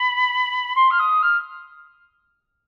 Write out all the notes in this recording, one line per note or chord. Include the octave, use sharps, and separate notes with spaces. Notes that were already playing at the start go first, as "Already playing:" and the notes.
Already playing: B5
C6
F6
D#6
F6